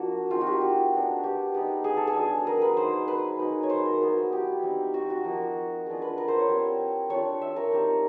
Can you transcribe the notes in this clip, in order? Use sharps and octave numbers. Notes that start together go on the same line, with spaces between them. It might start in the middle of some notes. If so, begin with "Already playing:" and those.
Already playing: F3 A#3 D4 F#4
G#3 C4 D#4 F4
F#4
G4
F#4
G#3 B3 D4
G4
G#3 B3 D#4
G#4
A4
G#4
F#3 B3 D4
A#4
B4
A#3 D#4 C5
B4
F#3 A#3 D#4
C#5
C5
A#4
F#3 B3 E4
G4
G3 C4 D#4
F#4
F#4
F3 A#3 D#4
G#3 B3 D4 F4
B4
A#4
C5
C#5
G3 C4 E4
A3 D4 F4 C#5
E5
A#4
G3 C4 D#4